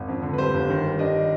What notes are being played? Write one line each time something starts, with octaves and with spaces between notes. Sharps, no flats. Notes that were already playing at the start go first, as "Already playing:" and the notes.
Already playing: G#1
F2
D3
B4
G3 C5
G1
D#3
G3
D4 D#5